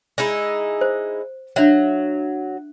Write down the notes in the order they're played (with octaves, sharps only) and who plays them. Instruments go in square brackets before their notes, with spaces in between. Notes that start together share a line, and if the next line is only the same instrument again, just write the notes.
[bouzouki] G#3 D#4 E4
[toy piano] C5
[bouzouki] F#3 [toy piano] D4 E5 F#5